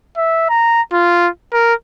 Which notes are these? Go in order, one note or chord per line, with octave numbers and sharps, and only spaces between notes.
E5
A#5
F4
A#4